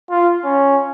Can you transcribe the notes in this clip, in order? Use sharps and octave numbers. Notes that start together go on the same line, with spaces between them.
F4
C#4